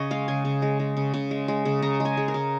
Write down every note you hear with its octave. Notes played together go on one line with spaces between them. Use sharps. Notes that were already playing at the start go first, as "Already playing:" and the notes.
Already playing: C#3 C#5 D#5
G#3 F5
C#3 G#5
C#3
G#3
G#3
C#3
C#3
G#3
G#3
C#3
C#3 A#5
G#3
G#5
G#3
A#4
C#3